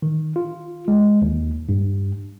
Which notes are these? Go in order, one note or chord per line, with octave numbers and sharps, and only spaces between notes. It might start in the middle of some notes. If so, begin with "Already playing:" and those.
D#3
F4
G#3
D#2
G2